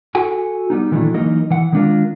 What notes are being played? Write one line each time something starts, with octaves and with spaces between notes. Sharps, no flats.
F#4 A4 F#5 G#5
G3 B3 D#4
A#2 D#3 E3 F#3 A3 D4
E3 F#3 A#3 D#4 A#4 D#5
E3 F#5
D#3 G#3 C#4 D4 F4 A#4